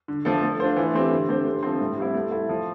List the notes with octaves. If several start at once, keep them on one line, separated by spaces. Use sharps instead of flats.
D3
F3 A3 D4 A4
A3
D4 F4 C5
E3
A3 C4 G4
D3
A3 C4 G4 C5
D3
F3 A3 C4
A2
G3 C4 E4
A3
E4 A4
F3